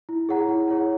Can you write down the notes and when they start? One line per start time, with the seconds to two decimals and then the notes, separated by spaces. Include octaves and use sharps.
0.09 E4
0.29 G#4 C#5 F#5 A#5
0.48 E4
0.68 G#4 C#5 F#5 A#5